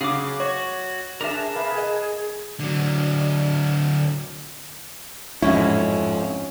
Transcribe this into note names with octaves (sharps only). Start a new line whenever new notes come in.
C#3 F#3 G#4 D6
F#4 C#5
D4 G#4 A#4 E5 A5
C3 B4 F5
D#5
D3 F#3
A1 F2 G#2 C#4 E4